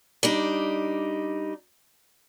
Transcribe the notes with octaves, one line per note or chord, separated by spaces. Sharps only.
G3 D4 D#4